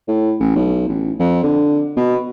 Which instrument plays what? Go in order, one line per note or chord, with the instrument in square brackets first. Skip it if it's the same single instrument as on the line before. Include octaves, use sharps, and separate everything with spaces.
[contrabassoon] A2
A1
B1
A1
F2
D3
B2